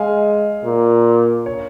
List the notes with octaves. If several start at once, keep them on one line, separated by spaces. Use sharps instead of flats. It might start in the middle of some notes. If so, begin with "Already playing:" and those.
Already playing: G#3 F5 G#5
A#2
C#5